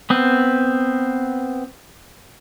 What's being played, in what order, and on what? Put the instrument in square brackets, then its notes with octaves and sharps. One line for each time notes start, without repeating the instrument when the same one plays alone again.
[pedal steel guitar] B3 C4